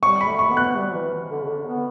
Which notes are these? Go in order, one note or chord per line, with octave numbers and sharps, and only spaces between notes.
G3 C#6
B5
A3
C#6
B3
F#6
G3
E3
D3
C#3
D3
B3